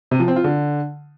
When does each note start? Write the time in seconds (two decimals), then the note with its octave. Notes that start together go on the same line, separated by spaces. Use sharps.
0.11 C3
0.20 F3
0.28 C4
0.36 F4
0.44 D3